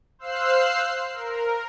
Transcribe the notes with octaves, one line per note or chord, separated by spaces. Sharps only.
C5 F5 E6 F#6 C7
A#4